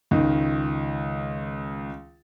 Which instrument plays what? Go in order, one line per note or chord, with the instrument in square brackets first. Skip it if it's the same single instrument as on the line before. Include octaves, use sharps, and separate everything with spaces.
[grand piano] C#2 D#3